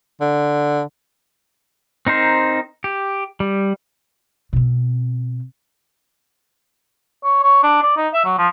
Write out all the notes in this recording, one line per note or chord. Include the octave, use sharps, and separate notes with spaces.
D3
C4 D#4 A#4 C5
G4
G3
B2 C4
C#5
C#5
D4
D5
D#4
E5
F#3
F3